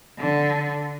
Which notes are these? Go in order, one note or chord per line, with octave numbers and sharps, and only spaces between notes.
D3